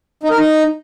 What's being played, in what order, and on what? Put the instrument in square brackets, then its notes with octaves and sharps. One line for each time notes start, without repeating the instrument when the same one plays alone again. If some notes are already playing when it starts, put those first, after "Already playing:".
[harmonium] D#4
A#4
D#4